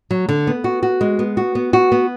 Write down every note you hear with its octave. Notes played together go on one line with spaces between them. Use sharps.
F#3
D3
B3
F#4
F#4
G#3
B3
F#4
B3
F#4
B3